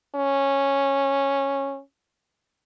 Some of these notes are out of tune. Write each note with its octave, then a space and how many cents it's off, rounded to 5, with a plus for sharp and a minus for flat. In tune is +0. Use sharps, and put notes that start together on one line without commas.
C#4 -10